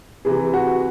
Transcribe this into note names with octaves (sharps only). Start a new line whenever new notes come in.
C3 E3 G#4
F#4